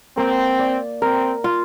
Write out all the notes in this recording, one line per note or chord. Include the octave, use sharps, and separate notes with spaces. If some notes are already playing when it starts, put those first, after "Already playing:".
A#3 C4
D5
C4 A#4
F4